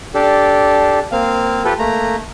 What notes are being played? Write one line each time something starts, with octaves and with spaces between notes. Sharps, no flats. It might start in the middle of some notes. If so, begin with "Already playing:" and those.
D4 G4 A4
A#3 C4 F5
F4 G4 A4 B4
A3 A#3 A#5